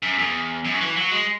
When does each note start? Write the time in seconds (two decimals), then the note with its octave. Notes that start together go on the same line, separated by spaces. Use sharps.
0.02 F#2
0.18 E2
0.65 F#2
0.74 F#3
0.81 E3
0.96 F#3
1.11 G#3